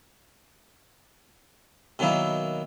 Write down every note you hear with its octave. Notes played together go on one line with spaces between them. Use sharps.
B2 D#3 F#3 A#3 E4